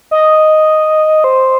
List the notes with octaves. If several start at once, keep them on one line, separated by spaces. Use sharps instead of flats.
D#5
C5